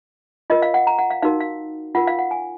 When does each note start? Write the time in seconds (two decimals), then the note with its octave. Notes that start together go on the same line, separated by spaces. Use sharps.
0.50 F4 A#4 D#5
0.62 F5
0.74 F#5
0.87 A#5
0.98 F#5
1.10 F5
1.23 D#4 F#4 A#4 F5
1.40 F5
1.95 F4 A#4 F#5
2.07 F5
2.19 F#5
2.31 G#5